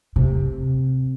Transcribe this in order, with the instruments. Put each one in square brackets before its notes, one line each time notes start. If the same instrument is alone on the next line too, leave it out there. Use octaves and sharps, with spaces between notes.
[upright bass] C3